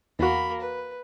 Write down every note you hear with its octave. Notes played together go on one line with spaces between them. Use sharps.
E2 A#3 F#4 B5
B4